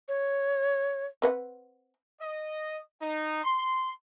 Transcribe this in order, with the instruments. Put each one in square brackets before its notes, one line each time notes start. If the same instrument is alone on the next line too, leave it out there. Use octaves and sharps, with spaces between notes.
[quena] C#5
[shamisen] C4 B4 F#5
[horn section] D#5
D#4
C6